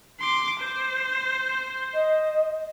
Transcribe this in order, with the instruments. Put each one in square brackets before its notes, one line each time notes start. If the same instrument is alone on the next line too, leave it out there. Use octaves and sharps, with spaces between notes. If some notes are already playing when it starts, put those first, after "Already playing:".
[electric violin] C6 D6
C5
[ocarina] D#5